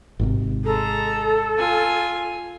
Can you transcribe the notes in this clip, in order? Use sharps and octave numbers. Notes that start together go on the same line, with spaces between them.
G#1 G#2 C3
G#3 A4 A#5
F4 G#5